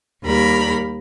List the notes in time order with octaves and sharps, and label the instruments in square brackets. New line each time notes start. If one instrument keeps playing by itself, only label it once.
[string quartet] D#2 G3 A#4 B5